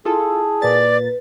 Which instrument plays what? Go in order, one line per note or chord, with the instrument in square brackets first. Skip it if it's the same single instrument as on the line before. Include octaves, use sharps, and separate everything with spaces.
[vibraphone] E4 A5 [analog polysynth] F4 A4 [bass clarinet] G#4
[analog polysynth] A#2 A#3 A6 [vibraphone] B4 [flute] D5